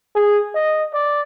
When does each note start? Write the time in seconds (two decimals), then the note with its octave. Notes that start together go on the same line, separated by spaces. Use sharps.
0.15 G#4
0.55 D#5
0.94 D5